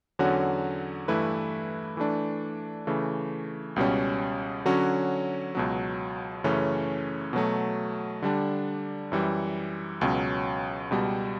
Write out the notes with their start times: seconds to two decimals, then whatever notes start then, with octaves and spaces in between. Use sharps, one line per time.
0.19 E2 D3 F#3 C#4 F#4
1.08 G2 E3 A3 E4 B4
1.97 E3 A3 D4
2.87 C#3 E3 A3
3.76 C#2 B2 G3 C#4
4.65 D3 F#3 C#4 F#4
5.55 C#2 B2 F#3
6.44 F#2 C#3 E3 A3 C#4
7.33 B2 F#3 A3
8.22 D3 G3 D4
9.12 F#2 E3 G3
10.01 C#2 B2 F#3 C#4
10.91 C#2 B2 G3